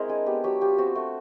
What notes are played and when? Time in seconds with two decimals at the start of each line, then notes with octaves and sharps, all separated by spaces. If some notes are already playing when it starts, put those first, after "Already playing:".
Already playing: G#3 C4 E4 A#4
0.09 D4 G#4
0.26 B3 G4
0.44 F#3 G4
0.61 F4 G4
0.78 C4 F#4
0.95 A3 F#4